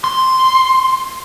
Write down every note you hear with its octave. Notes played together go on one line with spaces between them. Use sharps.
C6